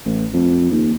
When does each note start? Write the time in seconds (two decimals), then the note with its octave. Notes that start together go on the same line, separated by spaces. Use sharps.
0.06 A1
0.34 F2
0.71 D#2